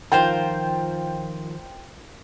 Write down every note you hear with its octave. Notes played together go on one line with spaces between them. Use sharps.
D#3 F3 F4 A#4 C5 G5